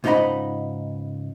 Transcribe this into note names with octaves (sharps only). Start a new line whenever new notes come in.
C#2 G#2 D#4 D#5 F#5 B5